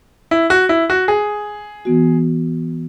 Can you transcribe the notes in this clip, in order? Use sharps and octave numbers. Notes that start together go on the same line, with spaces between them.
E4
F#4
E4
F#4
G#4
E3 B3 F#4